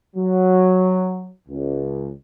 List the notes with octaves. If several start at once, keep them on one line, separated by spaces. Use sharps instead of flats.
F#3
C#2